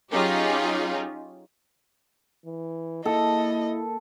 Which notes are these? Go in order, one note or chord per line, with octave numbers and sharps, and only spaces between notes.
F#3 C#4 D#4 F4 G4 G#4
E3
A#3 E4 A4 D#5